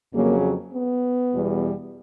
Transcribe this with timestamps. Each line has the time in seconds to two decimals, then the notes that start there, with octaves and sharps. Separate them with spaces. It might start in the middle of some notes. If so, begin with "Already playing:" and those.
0.13 F2 C#3 F#3 A#3
0.73 B3
1.32 E2 B2 G3